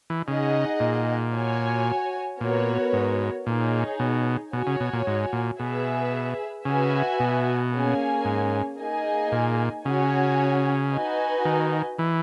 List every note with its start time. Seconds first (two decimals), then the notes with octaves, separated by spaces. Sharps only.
0.10 E3
0.28 C#3 D#4 G#4 D#5 F#5
0.80 A#2
1.33 F#4 C#5 G#5
2.40 A#2 B3 F#4 A#4 C#5
2.93 G#2
3.47 A#2 D#4 G#4 C#5
4.00 B2
4.53 B2 F#4 C#5 G#5
4.67 C#3
4.80 B2
4.93 A#2
5.07 G#2
5.33 A#2
5.59 B2 G#4 B4 E5
6.65 C#3 F#4 B4 E5 G#5
7.20 B2
7.73 A#3 C#4 G#4 C#5 G#5
8.25 G#2
8.78 A#3 D#4 G#4 D#5 G#5
9.32 A#2
9.85 C#3 C#4 F#4 C#5 G#5
10.91 D#4 F#4 B4 D#5 G#5
11.45 D#3
11.99 E3